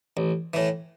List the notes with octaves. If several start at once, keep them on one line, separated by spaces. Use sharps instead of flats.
A1
A2 E3